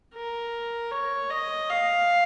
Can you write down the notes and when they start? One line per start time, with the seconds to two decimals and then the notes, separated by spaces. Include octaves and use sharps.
0.15 A#4
0.92 C#5
1.30 D#5
1.70 F5